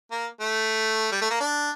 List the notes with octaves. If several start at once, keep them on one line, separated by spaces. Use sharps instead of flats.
A#3
A3
G3
A3
A#3
D4